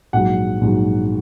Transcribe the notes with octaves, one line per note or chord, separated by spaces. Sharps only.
A#1 G#2 F#3 F#5
A#1 G#2 F#3